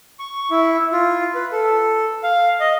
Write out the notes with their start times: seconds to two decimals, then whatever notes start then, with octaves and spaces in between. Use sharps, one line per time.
0.19 C#6
0.51 E4
0.93 F4
1.35 B4
1.52 A4
2.23 F5
2.60 D#5